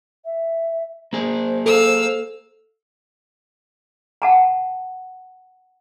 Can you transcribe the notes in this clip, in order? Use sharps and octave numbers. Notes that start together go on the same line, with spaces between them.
E5
A#3 G#4 C5
A4 F5 E6
F#5 A5 A#5